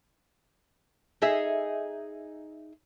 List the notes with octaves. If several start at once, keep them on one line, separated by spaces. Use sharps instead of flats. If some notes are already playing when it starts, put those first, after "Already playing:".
D#4 G#4 E5